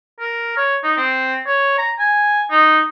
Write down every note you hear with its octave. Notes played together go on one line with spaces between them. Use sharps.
A#4
C#5
D#4
C4
C#5
A#5
G#5
D#4